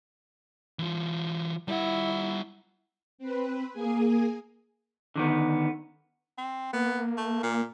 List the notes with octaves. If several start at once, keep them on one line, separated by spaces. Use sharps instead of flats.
E3 F4
G3 E4 F#5
C4 B4
A#3 G#4 G#5
D3 D#3 B3
C4
A#3 B3
A3
A#2